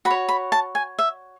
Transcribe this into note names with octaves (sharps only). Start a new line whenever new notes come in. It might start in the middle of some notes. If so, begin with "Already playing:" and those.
F#4 B5
C#5
B5
A5
G#5
E5